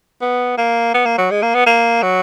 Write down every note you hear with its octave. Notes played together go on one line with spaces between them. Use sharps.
B3
A#3
B3
A#3
F#3
G#3
A#3
B3
A#3
F#3